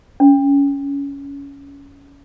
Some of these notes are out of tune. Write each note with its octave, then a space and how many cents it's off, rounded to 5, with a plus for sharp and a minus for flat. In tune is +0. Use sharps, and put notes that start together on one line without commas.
C#4 +20